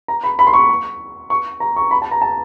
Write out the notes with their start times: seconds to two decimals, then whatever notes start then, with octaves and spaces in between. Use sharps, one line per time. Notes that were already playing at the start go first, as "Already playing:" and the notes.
0.08 A#5
0.24 B5
0.39 B5
0.47 C6
0.53 C#6
1.30 C#6
1.60 A#5
1.77 C#6
1.91 B5
2.02 A5
2.11 A#5
2.22 A5